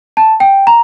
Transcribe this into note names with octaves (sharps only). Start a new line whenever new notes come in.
A5
G5
A#5